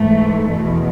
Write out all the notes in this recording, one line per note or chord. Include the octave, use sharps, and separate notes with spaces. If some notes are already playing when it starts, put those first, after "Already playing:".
Already playing: G#2 E3 A3
E2 B2